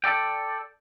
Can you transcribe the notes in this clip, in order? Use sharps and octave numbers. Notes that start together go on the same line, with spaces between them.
A4 D5 G5